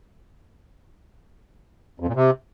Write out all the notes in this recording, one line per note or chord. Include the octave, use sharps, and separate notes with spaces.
F2
A#2
C3